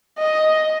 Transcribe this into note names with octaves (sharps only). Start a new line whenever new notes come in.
D#5